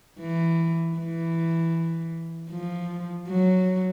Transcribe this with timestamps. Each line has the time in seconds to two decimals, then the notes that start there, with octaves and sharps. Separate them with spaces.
0.20 E3
0.97 E3
2.50 F3
3.28 F#3